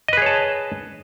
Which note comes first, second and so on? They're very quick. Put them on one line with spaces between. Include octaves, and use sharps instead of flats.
D#5 B4 G#4 C#5 A5